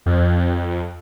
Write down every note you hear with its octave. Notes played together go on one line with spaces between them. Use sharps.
F2